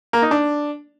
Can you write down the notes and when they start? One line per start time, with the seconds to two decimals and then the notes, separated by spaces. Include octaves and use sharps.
0.13 A#3
0.22 D#4
0.31 D4